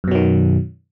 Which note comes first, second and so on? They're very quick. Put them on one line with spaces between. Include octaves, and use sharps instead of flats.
F#2 B2 F#3 D#3